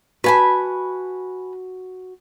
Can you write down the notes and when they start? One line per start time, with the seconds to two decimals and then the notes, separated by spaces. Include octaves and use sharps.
0.24 F#4 B4 G#5 A5 B5